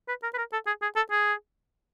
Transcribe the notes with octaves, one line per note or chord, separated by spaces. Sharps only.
B4
A#4
B4
A#4
A4
G#4
G#4
A4
G#4